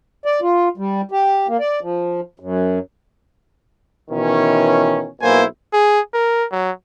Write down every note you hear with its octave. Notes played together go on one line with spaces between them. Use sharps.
D5
F4
G3
G4
A#3
D5
F3
F#2
B2 D#3 E3 C#4
B1 B2 A#3 E4 C5 G#5
G#4
A#4
F#3